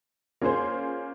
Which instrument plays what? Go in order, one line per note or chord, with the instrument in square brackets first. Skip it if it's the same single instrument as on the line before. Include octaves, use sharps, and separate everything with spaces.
[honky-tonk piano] A#3 C#4 F4 G#4 C5